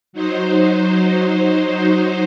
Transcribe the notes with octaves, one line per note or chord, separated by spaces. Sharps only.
F#3 D#4 C5